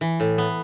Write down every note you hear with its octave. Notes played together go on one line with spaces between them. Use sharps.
E3
A2
B3